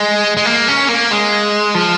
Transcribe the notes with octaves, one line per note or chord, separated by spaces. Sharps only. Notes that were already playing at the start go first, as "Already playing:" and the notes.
Already playing: G#3
G#3
A#3
C#4
A#3
G#3
F3